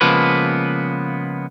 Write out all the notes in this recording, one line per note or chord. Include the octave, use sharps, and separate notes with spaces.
C#3 F3 G#3 A#3 B3 B4